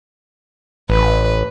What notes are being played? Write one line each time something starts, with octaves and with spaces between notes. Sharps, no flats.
A1 B4